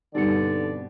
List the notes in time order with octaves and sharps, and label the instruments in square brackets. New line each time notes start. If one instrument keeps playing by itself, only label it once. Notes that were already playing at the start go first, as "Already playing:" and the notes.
[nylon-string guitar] G2 B2 C4 [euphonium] D3 [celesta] D#4 G4 C#7 [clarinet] D5